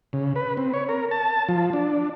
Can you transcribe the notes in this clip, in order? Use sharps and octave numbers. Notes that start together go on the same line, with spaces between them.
C#3
B4
C4
C#5
A#4
A5
F3
D4